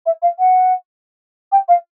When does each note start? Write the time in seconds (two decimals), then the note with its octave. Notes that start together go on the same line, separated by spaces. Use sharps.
0.06 E5
0.22 F5
0.39 F#5
1.52 G5
1.68 F5